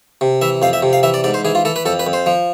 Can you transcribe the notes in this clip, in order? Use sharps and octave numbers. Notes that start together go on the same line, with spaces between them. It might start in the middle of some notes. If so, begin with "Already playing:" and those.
C3
E3 E5
F2 F5
E5
C3
F5
E3 E5
D5
G#2 D5
C5
E3 G#4
F4
E3 A4
B4
F2 A4
B4
F2
C5
F3